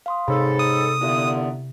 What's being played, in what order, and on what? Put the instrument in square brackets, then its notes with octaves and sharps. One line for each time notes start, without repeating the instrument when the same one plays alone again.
[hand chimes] F5 C6 D#6
[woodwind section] G#2 A4 [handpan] C3 [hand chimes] C#5 B5
[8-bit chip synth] D#6
[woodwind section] A#2 D3 B3 [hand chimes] E4 G4 E5